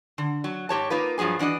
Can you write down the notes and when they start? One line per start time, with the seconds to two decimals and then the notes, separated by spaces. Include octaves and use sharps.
0.18 D3
0.44 F#3
0.69 G#2 G4 C#5 A5
0.90 A#3 D#4 F4 B4
1.18 G2 F3 F#3 G#4 G#5
1.39 E3 D4 F#4 D#5